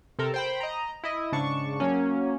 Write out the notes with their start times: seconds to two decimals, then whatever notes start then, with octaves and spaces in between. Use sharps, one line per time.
0.19 C3 A4 A#4
0.34 C5 G5 B5
0.61 D#5 A#5
1.04 E4 D#5
1.32 G#2 C#3 D4 A5 C#6
1.80 F#3 A#3 C#4